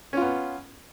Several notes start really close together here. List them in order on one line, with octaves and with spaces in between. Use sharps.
C#4 F4 B3